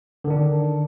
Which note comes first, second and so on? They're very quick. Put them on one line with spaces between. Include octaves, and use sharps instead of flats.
D3 D#3 D4